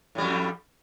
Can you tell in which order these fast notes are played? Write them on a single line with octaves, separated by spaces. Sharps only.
A2 G3 F2